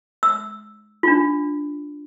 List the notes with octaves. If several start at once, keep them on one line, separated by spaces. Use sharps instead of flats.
E6
D4 F4